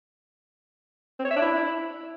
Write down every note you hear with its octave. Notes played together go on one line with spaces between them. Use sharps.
C4
C#5
E5
D4
E4